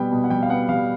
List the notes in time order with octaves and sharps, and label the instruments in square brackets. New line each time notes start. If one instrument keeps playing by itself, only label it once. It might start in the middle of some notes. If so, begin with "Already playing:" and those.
Already playing: [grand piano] B2 G3 B3 G5
B2
F#5
G3 G5
F5
B3 F#5
G3 F5